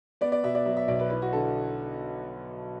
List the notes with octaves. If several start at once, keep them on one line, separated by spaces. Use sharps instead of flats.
B3 D5
D5
B2 E5
D5
F#3 E5
E5
B1 D5
B4
E4 B4
F#4
D3 A4